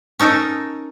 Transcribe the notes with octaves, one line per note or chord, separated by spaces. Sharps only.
C#4 D#4 A4 A#4